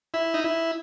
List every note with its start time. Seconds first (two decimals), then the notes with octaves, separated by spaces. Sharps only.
0.14 E4
0.34 D#4
0.44 E4